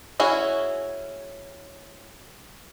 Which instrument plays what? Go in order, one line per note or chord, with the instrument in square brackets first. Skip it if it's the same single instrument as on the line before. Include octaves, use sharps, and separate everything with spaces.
[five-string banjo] C#4 E4 F#4 G#4